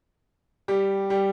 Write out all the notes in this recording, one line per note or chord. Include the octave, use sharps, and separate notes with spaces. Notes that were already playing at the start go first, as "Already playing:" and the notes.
G3 G4
G3 G4